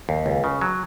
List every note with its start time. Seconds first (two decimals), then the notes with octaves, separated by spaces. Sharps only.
0.09 D#2
0.26 C#2
0.44 C#3
0.61 F#3